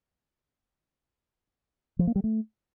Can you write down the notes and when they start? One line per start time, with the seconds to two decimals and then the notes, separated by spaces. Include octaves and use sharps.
1.99 F3
2.07 A#3
2.16 G3
2.24 A3